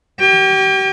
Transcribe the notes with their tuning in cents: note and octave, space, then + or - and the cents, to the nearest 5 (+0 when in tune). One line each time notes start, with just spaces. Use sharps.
G4 -35 G5 +40